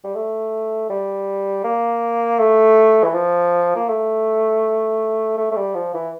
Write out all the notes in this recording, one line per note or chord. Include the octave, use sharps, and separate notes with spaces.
G3
A3
G3
A#3
A3
E3
F3
A#3
A3
A3
A3
G3
F3
E3